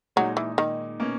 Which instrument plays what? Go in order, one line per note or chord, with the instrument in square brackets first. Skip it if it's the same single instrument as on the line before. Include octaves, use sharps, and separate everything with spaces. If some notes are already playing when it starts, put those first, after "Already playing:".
[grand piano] A#2 G#3 D#4 [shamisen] F#3
[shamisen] E3
D#3
[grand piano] B2 A#3 C#4